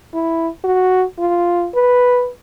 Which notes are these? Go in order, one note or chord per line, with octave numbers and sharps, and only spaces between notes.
E4
F#4
F4
B4